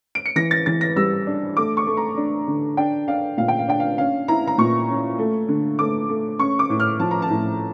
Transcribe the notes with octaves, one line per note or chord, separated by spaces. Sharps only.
D7
C#7
E3 A#6
A6
E3 A6
A#6
G3 E6
D4
A3 D6
C#6
A3
A#5
D4
D3
D4 G5
D4 F5
A#2 F5
G5
F5
D4 G5
F5
C#4 F5
E4 A#5
A#5
A#2 C#6
C#4
A3
D3
A3 D6
A3
C#4 C#6
D6
A2
F6
F3 A5
A#5
A5
A2